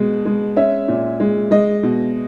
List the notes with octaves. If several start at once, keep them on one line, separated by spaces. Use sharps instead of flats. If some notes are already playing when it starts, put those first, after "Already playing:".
Already playing: B2 G#3
G#3
C#4 E5
A#2
G#3
G#3 D#5
B2